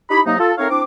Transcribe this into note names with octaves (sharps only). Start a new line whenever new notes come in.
D#4 E4 G4 B5
C3 F#3 A#3 D#4
F4 A4
A3 C4 D#4 A#4 C#5 F5
C4 D4 E4 D6